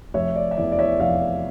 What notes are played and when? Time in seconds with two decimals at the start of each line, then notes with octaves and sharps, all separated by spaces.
0.14 F1 C#5 E5
0.36 D5
0.51 E5
0.57 E2 E3 D5
0.72 D5
0.79 C#5 E5
1.00 F1 D5 F5